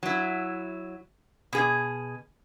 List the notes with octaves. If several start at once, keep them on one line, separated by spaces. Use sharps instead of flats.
F#3 E4
B2 G#4